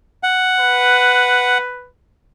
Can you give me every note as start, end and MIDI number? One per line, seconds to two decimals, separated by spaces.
0.23 1.58 78
0.60 1.89 71